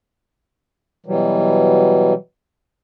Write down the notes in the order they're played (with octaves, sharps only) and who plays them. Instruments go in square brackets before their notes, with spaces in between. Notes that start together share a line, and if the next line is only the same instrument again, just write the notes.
[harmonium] B2 E3 F#3 G3